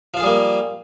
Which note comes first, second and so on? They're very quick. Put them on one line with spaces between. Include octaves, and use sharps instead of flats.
F3 F4 G#4 G3 A#3